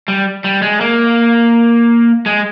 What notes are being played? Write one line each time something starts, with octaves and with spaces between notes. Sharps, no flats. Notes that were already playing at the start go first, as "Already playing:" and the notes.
G3
G3
G#3
A#3
G#3